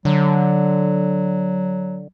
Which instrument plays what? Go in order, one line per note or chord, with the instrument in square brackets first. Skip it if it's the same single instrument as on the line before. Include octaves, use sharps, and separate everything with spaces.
[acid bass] D3 [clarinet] F#3